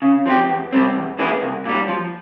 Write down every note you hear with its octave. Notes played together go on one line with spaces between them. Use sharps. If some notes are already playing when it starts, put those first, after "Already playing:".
C#3
F3 C4 G4
E2
C3 G3 C4
E2
E3 A#3 E4 G#4
C2
A#2 G3
F3